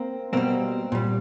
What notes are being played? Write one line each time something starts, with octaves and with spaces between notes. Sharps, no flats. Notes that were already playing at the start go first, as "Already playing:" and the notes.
Already playing: A#3 C4
B2 G3 A#3 C4
A#2 G3